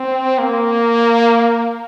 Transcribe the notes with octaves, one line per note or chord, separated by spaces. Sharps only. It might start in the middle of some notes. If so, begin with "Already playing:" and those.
Already playing: C4
A#3